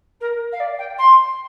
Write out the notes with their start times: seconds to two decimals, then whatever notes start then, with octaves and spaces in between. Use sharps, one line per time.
0.20 A#4
0.52 F5
0.59 D5
0.78 G5
0.98 C6